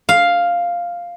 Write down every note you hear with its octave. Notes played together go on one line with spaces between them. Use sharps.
F5